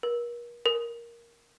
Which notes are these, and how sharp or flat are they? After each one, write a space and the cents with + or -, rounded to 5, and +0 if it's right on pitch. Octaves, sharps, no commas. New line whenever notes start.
A#4 +40
A#4 +5